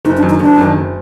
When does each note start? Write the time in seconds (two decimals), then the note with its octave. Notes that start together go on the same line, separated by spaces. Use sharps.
0.05 F#1 D#4
0.17 D4
0.22 F#2 D#3
0.29 D#4
0.40 F#1 D4
0.58 F#2 D#3
0.76 F#1